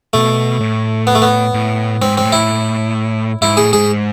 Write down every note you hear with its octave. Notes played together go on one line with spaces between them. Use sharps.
B2 A3
A2
B3
A3
B3
A2
G#2 C4
C4
A2
E4
G#2 E4
A2 G#4
G#2 G#4